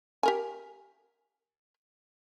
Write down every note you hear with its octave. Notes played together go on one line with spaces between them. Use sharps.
G4 A#4 G#5